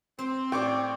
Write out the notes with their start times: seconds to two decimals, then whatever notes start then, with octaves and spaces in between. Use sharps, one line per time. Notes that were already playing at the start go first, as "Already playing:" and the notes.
0.19 C4 C5
0.52 A2 D5 G5 C#6 D6